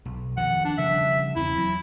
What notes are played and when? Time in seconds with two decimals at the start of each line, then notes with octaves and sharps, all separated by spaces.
0.05 B1
0.37 F2 D#3 F3 F#5
0.65 D4
0.78 C#3 F3 G3 E5
1.36 E2 C4 E4
1.57 F#3